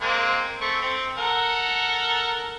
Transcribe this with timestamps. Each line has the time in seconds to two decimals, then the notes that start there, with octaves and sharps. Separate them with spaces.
0.01 G#3 A#3 C4
0.61 A3 C4 C#6
0.81 C4
1.18 A4 A#4 F#5